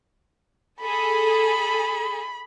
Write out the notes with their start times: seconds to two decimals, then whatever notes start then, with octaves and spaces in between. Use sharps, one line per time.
0.82 G#4 A4 B5